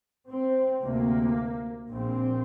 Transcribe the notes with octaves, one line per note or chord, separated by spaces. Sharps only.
C4
D2 C3 A#3
A#1 A#2 C4